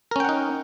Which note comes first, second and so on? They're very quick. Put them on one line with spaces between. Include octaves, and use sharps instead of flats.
A#4 C#4 G5 F#5 D#4